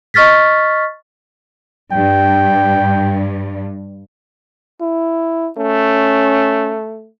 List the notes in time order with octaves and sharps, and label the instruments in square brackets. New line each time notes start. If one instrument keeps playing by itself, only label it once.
[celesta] D#5 C#6 F6 A6 B6
[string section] G2 [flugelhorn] G5
[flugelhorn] E4
[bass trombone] A3 [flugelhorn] C#4